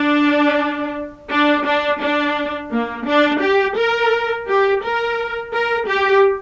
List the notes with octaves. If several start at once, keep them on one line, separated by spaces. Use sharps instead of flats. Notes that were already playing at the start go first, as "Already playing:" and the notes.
Already playing: D4
D4
D4
D4
A#3
D4
G4
A#4
G4
A#4
A#4
G4